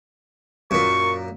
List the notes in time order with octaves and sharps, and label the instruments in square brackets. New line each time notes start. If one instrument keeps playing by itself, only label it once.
[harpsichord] F#2 A#2 [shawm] C#6